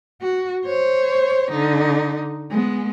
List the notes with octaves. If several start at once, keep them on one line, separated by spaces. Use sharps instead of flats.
F#4
C5 C#5
D3 D#4
G#3 B3